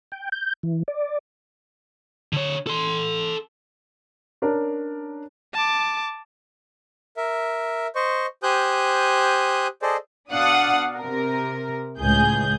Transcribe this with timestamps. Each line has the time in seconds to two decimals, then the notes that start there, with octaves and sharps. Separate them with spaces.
0.12 G5
0.32 G6
0.63 E3
0.88 D5
2.33 D3 C#5
2.67 A4 C6
4.42 C#4 D4 A#4
5.54 A5 D6
7.17 A#4 E5
7.95 C5 D#5 C#6
8.43 G4 C5 G#5 D#6 F#6 G6
9.82 G#4 A4 C5 D5 D#5
10.31 B2 D4 F5 F#5 D#6
10.97 C3 A#4
11.99 C#2 A2 G#4 G6